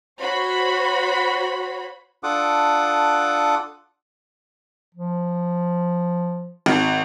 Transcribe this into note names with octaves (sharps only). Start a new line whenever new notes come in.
F#4 C5 C#5 B5
D4 F4 A4 F#5 D6 D#6
F3
G#1